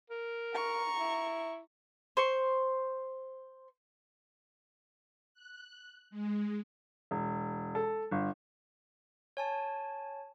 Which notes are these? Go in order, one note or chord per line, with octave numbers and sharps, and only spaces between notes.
A#4
A#5 C#6
E4
C5 C#6
F#6
G#3
E1
A4
G1
C#5 G#5 A5